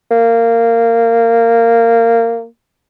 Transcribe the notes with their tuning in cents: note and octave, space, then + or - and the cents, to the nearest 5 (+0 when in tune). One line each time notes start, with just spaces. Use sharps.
A#3 -15